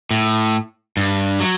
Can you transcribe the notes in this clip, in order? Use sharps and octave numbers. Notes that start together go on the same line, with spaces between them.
A2
G2
F#3